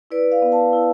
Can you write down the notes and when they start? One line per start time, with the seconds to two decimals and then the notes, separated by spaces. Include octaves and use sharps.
0.11 E4 B4 D5
0.32 D5 F5
0.42 B3
0.52 F5 A5
0.73 E4